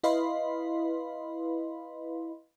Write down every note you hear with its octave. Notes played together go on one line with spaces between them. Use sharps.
E4 B4 D#5 F5 B5 C6